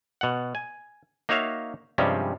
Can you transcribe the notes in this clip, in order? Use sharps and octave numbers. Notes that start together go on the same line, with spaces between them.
B2 F#5
G#5
A#3 D#4 F#4 C#5 E5 F5
G2 C3 F3 G3 G#3 C#4